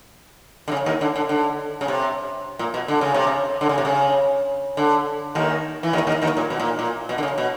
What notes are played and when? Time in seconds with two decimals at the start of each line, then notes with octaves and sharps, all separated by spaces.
0.68 D3
0.72 C#3
0.86 D#2 D#3
1.01 D3
1.16 D3
1.29 D3
1.81 C#3
1.88 C3
2.59 A#2
2.74 B2
2.88 D3
3.01 C#3
3.14 C3
3.27 C#3
3.61 D3
3.69 C#3
3.78 C3
3.85 C#3
4.77 D3
5.35 D#2 D#3
5.83 E3
5.93 D#2 D#3
6.07 D#2 D#3
6.22 D#2 D#3
6.37 A#2
6.50 B2
6.60 A#2
6.79 A#2
7.09 B2
7.18 D3
7.23 C#3
7.38 B2